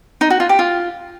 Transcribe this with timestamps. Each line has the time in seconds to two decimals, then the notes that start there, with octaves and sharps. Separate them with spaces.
0.21 D#4
0.30 F#4
0.40 F4
0.49 G4
0.59 F4